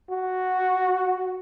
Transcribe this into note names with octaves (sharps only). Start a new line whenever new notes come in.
F#4